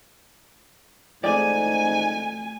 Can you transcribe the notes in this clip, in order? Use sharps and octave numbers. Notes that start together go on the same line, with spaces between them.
G#2 A3 G#4 D5 G#5